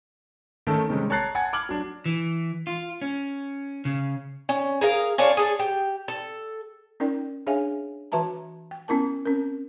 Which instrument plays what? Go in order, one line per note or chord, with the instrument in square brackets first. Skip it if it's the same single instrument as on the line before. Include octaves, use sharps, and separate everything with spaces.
[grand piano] D#3 A3 C#4 A4
C3 D#3 G3 G#3 C#4
C#5 A5 A#5 F#6 A6 C7
F#5 G#5 A5 G#6 A6 C#7
D6 F6 G#6 F#7
F#3 D4
[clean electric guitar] E3
F4
C#4
C#3
[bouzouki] C#4
G#4 A#4 F5
C#4 D4 F4 C#5
G#4 A4
G4
A4
[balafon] C#4 D#4 A#4 D5 G5
D4 G#4 C#5 E5 F5 G#5
E3 F#4 B4 E5 A5 A#5
G5
B3 C#4 E4 A#4 A5
C4 C#4 A#4